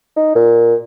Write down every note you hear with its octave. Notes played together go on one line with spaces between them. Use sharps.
D#4
A#2